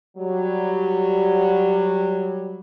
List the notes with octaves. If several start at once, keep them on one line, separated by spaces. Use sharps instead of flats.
F#3 G3